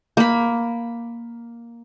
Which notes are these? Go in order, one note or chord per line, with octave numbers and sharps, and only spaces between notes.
A#3 B5